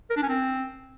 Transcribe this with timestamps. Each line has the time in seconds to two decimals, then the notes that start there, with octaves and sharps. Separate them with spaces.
0.10 A#4
0.16 D4
0.23 C#4
0.29 C4